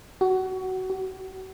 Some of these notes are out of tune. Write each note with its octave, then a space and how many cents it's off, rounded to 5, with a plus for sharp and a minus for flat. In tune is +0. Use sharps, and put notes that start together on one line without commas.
F#4 +20
F#4 +40